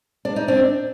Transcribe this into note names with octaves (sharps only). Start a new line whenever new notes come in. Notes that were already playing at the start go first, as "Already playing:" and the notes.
D4
D#4
C4 D4